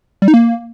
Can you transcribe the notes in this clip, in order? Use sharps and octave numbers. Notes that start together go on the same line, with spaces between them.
G3
D#4
A#3